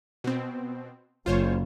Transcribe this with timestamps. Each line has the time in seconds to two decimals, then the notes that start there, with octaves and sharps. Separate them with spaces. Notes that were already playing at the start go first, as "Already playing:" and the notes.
0.24 B2 C4
1.26 F#1 F4 C5 C#5